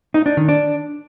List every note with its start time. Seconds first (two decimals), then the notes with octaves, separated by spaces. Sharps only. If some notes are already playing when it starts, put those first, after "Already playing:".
0.14 D#4
0.26 D4
0.37 D#3
0.49 D4